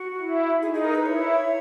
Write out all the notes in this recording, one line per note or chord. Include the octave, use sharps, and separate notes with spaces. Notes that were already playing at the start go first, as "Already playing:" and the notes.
Already playing: F#4
E4
D#4 G#4
G#4
A#4
B4
E4 C#5